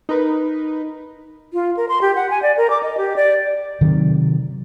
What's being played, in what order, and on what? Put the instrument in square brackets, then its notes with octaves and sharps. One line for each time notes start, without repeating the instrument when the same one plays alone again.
[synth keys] D#4 A#4 B4
[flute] F4
A#4
C6
G4
F#5
G#5
D5
A#4
D6
D#5
G4
D5
[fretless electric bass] C3 D#3 F#3